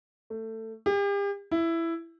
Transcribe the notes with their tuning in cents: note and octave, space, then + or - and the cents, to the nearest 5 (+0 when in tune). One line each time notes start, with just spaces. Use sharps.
A3 +20
G4 +40
E4 +10